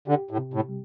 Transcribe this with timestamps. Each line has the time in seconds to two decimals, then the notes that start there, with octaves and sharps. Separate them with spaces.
0.07 D3 G4
0.31 A2
0.38 C3
0.54 A2
0.69 G3